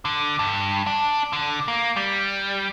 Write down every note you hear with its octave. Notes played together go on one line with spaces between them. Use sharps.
D3
G2
D4
D3
A#3
G3